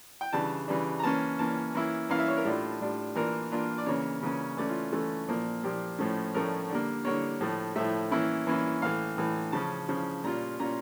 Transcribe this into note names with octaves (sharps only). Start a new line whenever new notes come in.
G5
C#3 E3 G3 D4 A5
C#3 E3 G3 D4
A#5
E3 A#3 C#4 A5
E3 A#3 C#4 A5
E3 A#3 C#4 E4
E3 A#3 C#4 E4 F5
E5
C#5
A#4
A2 G3 D4 F4 A4
A2 G3 D4 F4
E3 A#3 D4 F4 A#4
E3 A#3 D4 F4
D5
C#3 E3 A#3 C#4 C#5
C#3 E3 A#3 C#4
E3 A3 C#4 D5
F4
E3 A3 C#4 A4
A#2 F3 A#3
A#2 F3 A#3 G4
A2 F3 A3 C#4
A2 F3 A3 C#4 A#4
D3 G3 A#3
D3 G3 A#3 C#5
A2 F3 A3
A2 F3 A3 E5
E3 A#3 C#4 E4
E3 A#3 C#4 E4
A2 E3 A3 F5
A2 E3 A3
C#3 F3 C#4 A5
C#3 F3 C#4
A#2 G3 C#4 F4 A#5
A#2 G3 C#4 F4 A#5